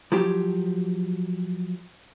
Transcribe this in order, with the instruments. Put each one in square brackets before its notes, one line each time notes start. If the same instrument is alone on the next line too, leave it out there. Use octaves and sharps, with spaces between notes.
[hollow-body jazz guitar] F3 F#3 G4